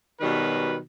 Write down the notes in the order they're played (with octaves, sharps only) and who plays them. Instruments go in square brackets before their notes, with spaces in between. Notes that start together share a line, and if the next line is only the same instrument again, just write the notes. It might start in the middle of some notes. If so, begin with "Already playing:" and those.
[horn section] B2 D#3 F#3 G3 B4